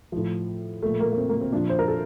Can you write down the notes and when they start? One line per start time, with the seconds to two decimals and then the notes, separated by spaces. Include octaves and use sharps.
0.12 A2 F3
0.82 A#2 F3 A3
1.00 A#3
1.12 A#3
1.17 C4
1.29 A#3
1.41 C4
1.52 A#2 F3 D4
1.70 C5
1.79 A#4
1.88 A4